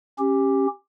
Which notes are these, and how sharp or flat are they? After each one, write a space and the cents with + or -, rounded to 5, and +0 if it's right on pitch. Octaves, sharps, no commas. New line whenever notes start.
C#4 -25 G4 +0